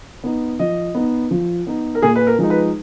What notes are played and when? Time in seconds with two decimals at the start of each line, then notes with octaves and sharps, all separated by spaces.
0.24 B3 D#4
0.59 F3 D#5
0.95 B3 D#4
1.31 F3
1.67 B3 D#4
1.95 A#4
2.02 A#2 G#4
2.16 B4
2.27 A#4
2.39 F3 G#3 D#4
2.50 B4